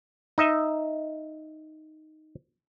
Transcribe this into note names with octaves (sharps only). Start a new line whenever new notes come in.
D#4 D#5 E5